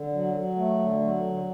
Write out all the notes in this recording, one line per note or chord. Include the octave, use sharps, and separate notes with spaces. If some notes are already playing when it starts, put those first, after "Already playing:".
Already playing: D3
F#3
F#3
A3
D3
F#3
D3